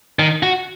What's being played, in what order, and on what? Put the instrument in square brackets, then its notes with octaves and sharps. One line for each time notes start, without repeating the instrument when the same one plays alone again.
[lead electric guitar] D#3
F#4